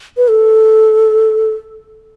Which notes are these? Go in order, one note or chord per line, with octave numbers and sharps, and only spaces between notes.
B4
A4